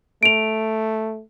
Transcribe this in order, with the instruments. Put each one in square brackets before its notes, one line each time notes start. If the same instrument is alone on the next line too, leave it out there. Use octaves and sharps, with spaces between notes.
[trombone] A3 [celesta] D7 F7